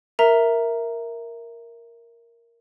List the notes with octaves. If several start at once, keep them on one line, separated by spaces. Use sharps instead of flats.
A#4 E5 A#5